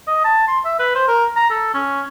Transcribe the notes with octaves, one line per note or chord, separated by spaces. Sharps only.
D#5
A5
C6
E5
B4
C5
A#4
A#5
A4
C#4